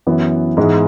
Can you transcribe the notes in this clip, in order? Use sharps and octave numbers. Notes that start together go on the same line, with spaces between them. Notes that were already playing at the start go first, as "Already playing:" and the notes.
F#2 E3 B3
G#2 E3 G#3 B3